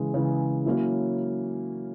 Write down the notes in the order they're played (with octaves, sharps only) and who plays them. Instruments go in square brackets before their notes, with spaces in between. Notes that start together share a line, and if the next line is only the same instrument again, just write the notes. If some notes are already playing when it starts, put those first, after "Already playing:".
Already playing: [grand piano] C#3 E3 G#3
C#3 E3 G#3
F#3 A#3 C#4 E4